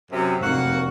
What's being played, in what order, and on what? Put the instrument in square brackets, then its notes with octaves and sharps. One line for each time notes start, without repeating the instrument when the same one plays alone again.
[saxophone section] F#2 C3
[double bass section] F1 [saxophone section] A#3 F#4 F#5